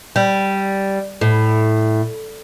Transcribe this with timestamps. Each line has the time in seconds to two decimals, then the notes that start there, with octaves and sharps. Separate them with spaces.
0.16 G3
1.21 A2